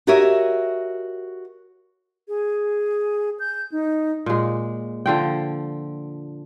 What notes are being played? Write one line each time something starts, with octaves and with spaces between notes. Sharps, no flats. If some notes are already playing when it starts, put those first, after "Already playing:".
F#4 G4 A#4 C#5 D#5 E5
G#4
G6
D#4
A#2 G#3
D3 F3 G5